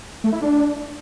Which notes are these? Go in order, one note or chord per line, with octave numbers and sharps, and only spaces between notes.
A3
E4
D4